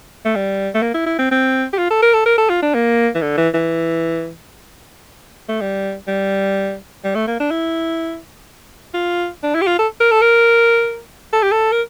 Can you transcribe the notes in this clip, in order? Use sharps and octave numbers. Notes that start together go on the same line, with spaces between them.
A3
G3
A3
A#3
E4
E4
C4
C4
G4
F4
A4
A#4
A4
A#4
A4
F4
D4
A#3
E3
D3
E3
E3
A3
G3
G3
G3
A3
A#3
D4
E4
F4
D4
E4
G4
F4
A4
A#4
A4
A#4
A4
G4
A4
A#4